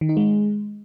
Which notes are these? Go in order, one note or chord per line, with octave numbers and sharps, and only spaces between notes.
D#3
D#4
G#3